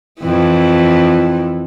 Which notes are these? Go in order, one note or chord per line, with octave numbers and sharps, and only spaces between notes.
F2 E3 E4